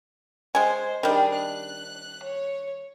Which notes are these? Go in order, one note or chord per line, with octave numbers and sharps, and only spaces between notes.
G#3 C5 G#5
D#3 G3 D4 G#4
F#6
C#5